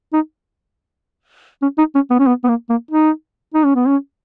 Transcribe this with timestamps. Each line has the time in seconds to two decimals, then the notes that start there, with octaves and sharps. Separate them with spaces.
0.13 D#4
1.62 C#4
1.78 D#4
1.95 C#4
2.10 B3
2.19 C#4
2.27 B3
2.44 B3
2.48 A#3
2.69 A#3
2.91 D#4
3.55 D#4
3.65 C#4
3.75 B3
3.86 C#4